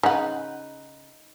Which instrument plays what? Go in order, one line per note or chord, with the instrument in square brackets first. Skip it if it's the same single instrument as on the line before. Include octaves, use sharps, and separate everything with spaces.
[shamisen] C#3 F#5 [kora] D#4 B4